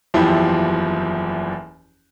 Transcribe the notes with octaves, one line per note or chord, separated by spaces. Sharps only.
F#1 E2 E3 F3 E4 G4